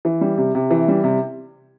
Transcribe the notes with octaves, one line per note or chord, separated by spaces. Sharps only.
E3
G3
C3
C3
E3
G3
C3